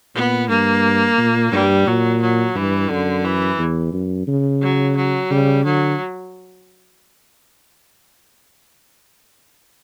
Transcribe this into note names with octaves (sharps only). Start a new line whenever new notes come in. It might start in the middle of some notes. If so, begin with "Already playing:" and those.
A#2 B3
G2 A#3
A#2
G2 G3
A#2 F#3
F#3
G2 E3
F#2 D3
E3
E2
F#2
C#3
F#3
F#3
C#3 G3
D3 F#3